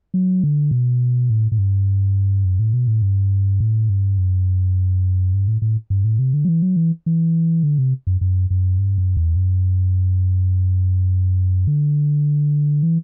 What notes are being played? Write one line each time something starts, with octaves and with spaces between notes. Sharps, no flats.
F#3
D3
B2
A2
A2
G2
F#2
A2
B2
A2
G2
A2
G2
F#2
G2
A2
A2
G2
A2
C3
D3
F#3
E3
F#3
E3
E3
D3
C3
F#2
F#2
F#2
G2
F#2
E2
F#2
D3
E3